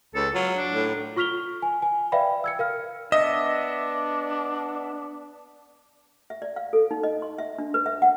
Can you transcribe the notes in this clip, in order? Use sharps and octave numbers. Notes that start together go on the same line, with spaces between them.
C#2 A4
F#3 F4
D4
A2
F4 C#6 F6 B6 F7 G7
G#5
G#5
B4 D5 E5 F5 G5 B5
E6 G#6 C#7
A#4 F5 F6
B3 D4 D#5 E5
E5
D5
F5
A4
D#4
D#5
C6
E5
D4
B4
E5
F#5